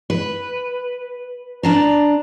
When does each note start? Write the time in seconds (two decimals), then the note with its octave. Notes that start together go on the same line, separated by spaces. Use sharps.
0.10 B4
1.63 D4 A5 A#5